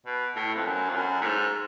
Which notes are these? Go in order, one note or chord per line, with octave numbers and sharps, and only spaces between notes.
B2
A2
F2
F#2
F2
F#2
A2
G#2